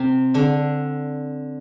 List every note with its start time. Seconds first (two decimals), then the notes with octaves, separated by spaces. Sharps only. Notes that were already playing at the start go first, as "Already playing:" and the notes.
Already playing: C3 C4
0.34 D3 D4